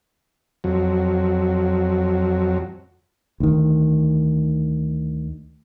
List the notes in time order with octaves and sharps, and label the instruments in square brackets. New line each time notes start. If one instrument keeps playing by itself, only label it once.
[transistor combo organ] F2 F#3
[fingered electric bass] D2 D#3